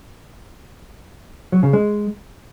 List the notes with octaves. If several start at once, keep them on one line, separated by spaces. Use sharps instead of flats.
F#3
C#3
G#3